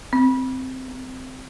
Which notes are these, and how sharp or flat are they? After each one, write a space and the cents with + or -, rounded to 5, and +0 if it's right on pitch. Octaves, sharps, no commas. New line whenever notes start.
C4 -10
C4 -20